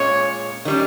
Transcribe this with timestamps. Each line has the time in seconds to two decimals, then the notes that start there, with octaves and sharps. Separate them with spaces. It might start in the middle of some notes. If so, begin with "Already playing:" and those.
Already playing: A#2 G#3 C#4 C#5
0.65 D#3 G3 C#4